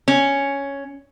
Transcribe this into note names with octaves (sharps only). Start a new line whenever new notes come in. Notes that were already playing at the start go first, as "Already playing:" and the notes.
C#4